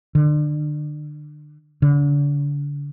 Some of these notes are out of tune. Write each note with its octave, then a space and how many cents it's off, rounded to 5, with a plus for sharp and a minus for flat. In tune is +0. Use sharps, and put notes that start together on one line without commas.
D3 +30
D3 -35